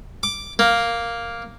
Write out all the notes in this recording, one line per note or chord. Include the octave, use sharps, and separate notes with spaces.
D6
A#3